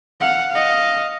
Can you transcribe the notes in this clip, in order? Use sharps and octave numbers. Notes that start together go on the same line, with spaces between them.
F5 F#5
D#5 F5